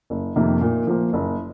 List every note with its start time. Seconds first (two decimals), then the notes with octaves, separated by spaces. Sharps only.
0.10 F#1
0.36 F2 C3 D#3 A#3
0.61 A#2
0.87 F3 A#3
1.13 F#1